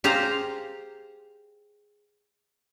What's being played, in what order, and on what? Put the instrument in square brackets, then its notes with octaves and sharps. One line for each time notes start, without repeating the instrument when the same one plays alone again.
[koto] G4 G#4 C5 F5 A#5